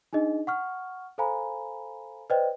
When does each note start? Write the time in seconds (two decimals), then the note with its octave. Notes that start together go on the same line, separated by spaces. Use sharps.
0.13 D4 D#4 G#4 D#5
0.47 F#5 C#6 F6
1.18 A4 C5 F5 G#5 A#5 B5
2.30 B4 C5 D5 D#5 G5